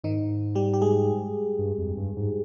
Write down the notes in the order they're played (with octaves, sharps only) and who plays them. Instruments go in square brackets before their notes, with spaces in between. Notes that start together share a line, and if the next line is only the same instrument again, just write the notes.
[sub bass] G#2 [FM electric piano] D#3 D#4
[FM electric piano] G3 G4
G4
G#3 G#4
[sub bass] G2
F2
G2
G#2